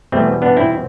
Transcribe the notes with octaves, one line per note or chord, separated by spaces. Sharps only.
E2 B2 G3 A3 C4
B3 D4
C4 E4